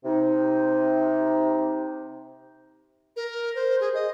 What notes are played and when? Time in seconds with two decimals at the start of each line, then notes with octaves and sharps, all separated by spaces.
0.05 C3 D#4
3.16 A#4
3.55 C5
3.80 G#4
3.94 D#5